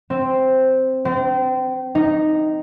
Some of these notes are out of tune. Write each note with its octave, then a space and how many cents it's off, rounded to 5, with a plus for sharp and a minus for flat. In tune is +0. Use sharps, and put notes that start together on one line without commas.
C4 +0
C4 -30
D#4 -5